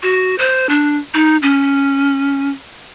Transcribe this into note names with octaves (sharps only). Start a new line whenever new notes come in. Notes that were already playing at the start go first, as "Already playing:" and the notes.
F#4
C5
D4
D#4
C#4